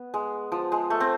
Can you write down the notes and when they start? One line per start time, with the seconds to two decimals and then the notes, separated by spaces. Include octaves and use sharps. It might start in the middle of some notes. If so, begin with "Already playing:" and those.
Already playing: B3
0.14 G#3
0.52 F3
0.72 G#3
0.90 A3
1.00 C4